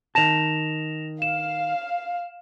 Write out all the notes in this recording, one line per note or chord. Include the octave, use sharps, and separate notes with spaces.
D#3 A5 A#6 E7 F7
F5 E7